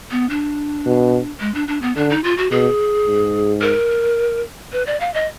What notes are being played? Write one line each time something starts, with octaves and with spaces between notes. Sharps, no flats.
B3
D4
B2
G#3
D4
D4
B3
D3 D4
D#4
F4
F#4
B2 G#4
G#2
A#4
B4
D5
F5
D#5